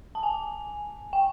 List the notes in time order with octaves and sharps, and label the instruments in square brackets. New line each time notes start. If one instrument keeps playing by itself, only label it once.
[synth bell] A5
G#5
G5